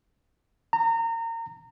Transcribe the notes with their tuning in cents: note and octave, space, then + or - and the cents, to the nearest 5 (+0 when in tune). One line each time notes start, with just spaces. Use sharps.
A#5 -30